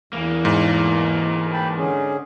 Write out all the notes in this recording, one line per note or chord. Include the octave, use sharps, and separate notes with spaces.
E2 E3 A#3
G#2
G5 A5 B5
D3 C#4 G#4